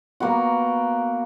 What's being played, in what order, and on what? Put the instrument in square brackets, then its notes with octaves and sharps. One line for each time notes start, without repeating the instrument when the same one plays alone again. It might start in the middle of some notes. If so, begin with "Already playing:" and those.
[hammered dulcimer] A#3 B3 F#4